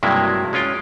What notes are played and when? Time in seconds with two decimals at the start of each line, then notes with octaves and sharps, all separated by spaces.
0.03 G2 C3 F#3 G#3 A#3 E4
0.53 G#3 C#4 F4 G5